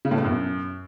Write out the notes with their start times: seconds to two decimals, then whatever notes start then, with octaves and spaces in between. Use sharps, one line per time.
0.05 C#3
0.11 A2
0.18 B2
0.24 F#2